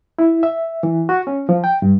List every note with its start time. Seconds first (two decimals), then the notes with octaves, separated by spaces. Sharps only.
0.19 E4
0.43 E5
0.83 E3
1.09 F#4
1.27 C#4
1.49 F3
1.64 G5
1.82 G2